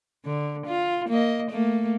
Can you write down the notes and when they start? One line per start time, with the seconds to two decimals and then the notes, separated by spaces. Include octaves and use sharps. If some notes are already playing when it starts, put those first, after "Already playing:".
0.25 D3
0.66 F4
1.09 A#3 D#5
1.50 A3 A#3